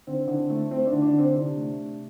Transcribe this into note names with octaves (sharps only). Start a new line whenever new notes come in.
D3 C4
D3
A3
A3 C4
D4
D3
D4
D3
C4
C3 D4
A3
C3